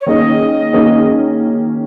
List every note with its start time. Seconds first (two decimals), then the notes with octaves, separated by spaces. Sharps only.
0.01 C#5
0.06 D#3 A#3 C#4 G#4 D#5
0.73 D#3 A#3 C#4 G#4